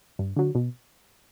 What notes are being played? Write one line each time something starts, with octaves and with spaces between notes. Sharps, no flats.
G2
D3 F#3
B2